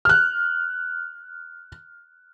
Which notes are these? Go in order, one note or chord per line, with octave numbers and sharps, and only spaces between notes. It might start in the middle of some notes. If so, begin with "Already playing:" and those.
F6 F#6